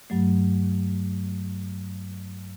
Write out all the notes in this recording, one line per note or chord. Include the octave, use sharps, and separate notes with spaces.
G2 F#3 A3